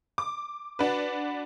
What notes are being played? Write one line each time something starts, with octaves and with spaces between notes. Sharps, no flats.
D6
D4 F#4 B4